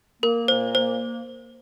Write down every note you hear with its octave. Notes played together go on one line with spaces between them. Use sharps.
A#3 A#4
A#2 C5
A#3 C5